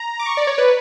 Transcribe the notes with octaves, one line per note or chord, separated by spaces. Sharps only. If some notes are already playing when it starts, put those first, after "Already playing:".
Already playing: A#5
D6
C#6
D5
C#5
B4